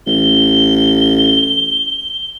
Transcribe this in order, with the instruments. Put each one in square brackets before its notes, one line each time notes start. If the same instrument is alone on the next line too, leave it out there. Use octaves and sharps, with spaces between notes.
[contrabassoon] A1 [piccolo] G7